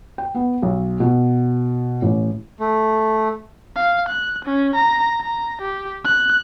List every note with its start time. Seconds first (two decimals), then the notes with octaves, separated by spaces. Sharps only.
0.18 G5
0.35 B3
0.62 B1
1.00 B2
2.02 A1
2.60 A3
3.76 F5
4.09 F#6
4.45 C#4
4.76 A#5
5.21 A#5
5.62 G4
6.05 F#6